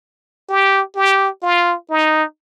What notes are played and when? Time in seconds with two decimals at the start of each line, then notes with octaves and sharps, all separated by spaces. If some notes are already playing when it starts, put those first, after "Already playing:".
0.49 G4
0.96 G4
1.43 F4
1.90 D#4